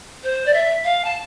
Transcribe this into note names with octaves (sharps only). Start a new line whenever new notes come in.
C5
D5
E5
F5
A5